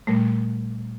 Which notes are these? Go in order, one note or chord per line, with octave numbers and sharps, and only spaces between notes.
A#2 G3 A3